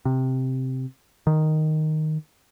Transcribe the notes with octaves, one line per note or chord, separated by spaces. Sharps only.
C3
D#3